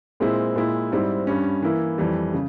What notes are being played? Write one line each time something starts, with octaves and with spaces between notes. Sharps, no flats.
A#2 G#3 C4 E4
A#2 G#3 E4
G#2 G3 C4 E4
G2 G3 C#4
E3 A#3 E4
F2 E3 G3
C#3